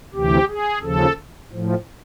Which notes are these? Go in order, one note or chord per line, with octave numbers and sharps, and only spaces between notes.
D2 C3 E3 G4
G#4
D#2 C#3 F3 A4
A2 F3